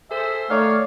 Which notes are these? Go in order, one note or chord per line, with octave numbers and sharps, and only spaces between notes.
G#4 A4 C5 E5
D#3 A3 C#5 D5 F5